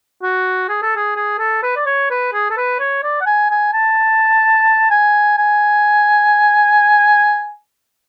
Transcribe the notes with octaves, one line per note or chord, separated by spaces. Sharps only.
F#4
G#4
A4
G#4
G#4
A4
B4
D5
C#5
B4
G#4
A4
B4
C#5
D5
F#5
G#5
G#5
A5
G#5
G#5